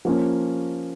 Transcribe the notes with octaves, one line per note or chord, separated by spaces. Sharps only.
F3 A#3 C#4